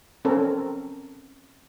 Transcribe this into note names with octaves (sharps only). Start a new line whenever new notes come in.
C4 C#4 A4 A#4